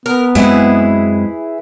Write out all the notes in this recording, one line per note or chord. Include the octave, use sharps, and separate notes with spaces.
B3 A#4
F#2 E3 G#3 C4 E4 G#4